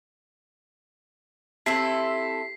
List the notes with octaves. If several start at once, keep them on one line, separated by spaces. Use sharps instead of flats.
C4 E4 G4 A4 E5 A5 B6 C7